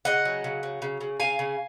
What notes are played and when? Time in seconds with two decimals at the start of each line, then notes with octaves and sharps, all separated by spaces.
0.05 C#3 D#5 F#5
0.25 F#3
0.44 C#3
0.63 F#3
0.82 C#3
1.01 C#3
1.20 C#3 F5 G#5
1.39 C#3